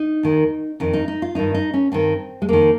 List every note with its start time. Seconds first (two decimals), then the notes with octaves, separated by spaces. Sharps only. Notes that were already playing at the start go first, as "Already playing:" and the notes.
Already playing: D#4
0.23 D#2 D#3
0.80 F2 D#3
0.93 D#4
1.08 D#4
1.22 F4
1.35 G2 D#3 D#4
1.54 D#4
1.74 C#4
1.92 G2 D#3 C4
2.42 G#3
2.49 F2 D#3 A#3